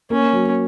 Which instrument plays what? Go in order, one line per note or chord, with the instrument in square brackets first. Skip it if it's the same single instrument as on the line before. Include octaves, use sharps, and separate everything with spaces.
[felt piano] A#3 [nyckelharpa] C#4
[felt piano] F#3